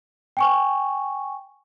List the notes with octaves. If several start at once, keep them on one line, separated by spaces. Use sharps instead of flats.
G5 G#5 C#6